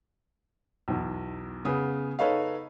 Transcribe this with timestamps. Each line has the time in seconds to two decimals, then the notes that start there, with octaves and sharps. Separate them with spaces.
0.88 B1 E2
1.65 C#3 B3 G#4 D#6
2.19 D#4 A4 B4 C#5 D#5 F5